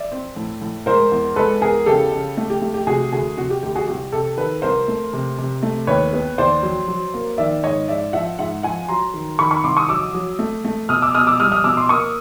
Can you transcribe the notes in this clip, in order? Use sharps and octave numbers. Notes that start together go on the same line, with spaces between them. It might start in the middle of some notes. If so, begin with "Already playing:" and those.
Already playing: D5 E5
C4
A2
A2
G#3 A#4 C5
E2
G#3 A4 B4
E2 G#4 A#4
C#3 G4 A4
C#3
A3
G4
A3
G4
C3 F#4 G#4
D2 F#4 G#4
C3 F#4
G4
D2 G4
F#4 G#4
C2 G4
C3 G4 A4
D#3 A4 B4
C2 A#4 C5
A3
C3
C3
A3
D#2 B4 C#5
B3
D#2 C5 D5
F#3
F#3
A#3
D#3 D5 E5
G#2 C#5 D#5
G#2 D5 E5
F3 E5 F#5
G#2 E5 F#5
F3 F#5 G#5
F#3 A#5 C6
D#3
D#3 B5 C#6
B5 C#6
C2 C6 D6
C#6 D#6
F#3 D6 E6
F#3
A3
A3
B2 D#6 F6
D6 E6
B2 D#6 F6
D6 E6
G3 D#6 F6
D#6 F6
B2 D6 E6
C6 D6
A#3 C#6 D#6